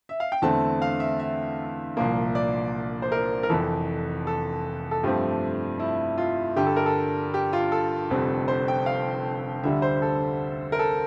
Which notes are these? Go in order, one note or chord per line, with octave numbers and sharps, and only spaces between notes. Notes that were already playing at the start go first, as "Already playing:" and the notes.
E5
F5
G5
E2 D3 A3 C4 A5
F5
E5
E5
C2 A#2 F3 A#3
D5
C5
A#4
A#4
F1 F2 E3 A4
A4
A4
G2 F3 A3 C4 G4
E4
F4
G2 D3 G3 G4
A4
A#4
A4
G4
F4
A4
F1 F2 D3 G3 C4
C5
G5
F5
D2 D3 G3 E5
C5
A4
A#4
A4